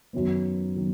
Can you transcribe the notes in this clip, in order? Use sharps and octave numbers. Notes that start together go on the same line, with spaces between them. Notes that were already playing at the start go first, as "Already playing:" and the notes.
F#2 D#3 F#3 B3
D#3 F#3 B3